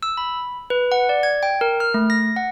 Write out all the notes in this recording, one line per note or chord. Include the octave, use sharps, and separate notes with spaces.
E6
B5
B4
F#5
D5
G#6
G5
A#4
F6
A3
A#6
F#5